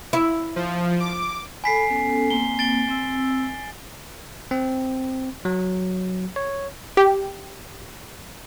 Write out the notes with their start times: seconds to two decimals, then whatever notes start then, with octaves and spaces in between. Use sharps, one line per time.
0.13 E4
0.56 F3
1.00 D6
1.64 A4 G#5 B5 B6 C7
1.90 B3 C#4 A4
2.30 A#3 C4 G7
2.59 A6 D7 G7
2.89 C4 E6
4.51 C4
5.45 F#3
6.36 C#5
6.97 G4